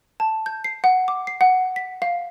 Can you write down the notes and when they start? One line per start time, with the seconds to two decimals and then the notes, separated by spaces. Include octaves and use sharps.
0.20 A5
0.46 G6
0.64 C7
0.84 F#5
1.08 D6
1.27 C7
1.41 F#5
1.76 B6
2.02 F5